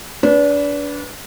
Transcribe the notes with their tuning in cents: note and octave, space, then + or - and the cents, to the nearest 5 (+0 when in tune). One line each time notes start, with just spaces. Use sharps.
D4 -30 B4 +0